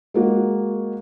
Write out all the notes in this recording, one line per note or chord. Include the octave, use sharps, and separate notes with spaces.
G#3 A#3 F#4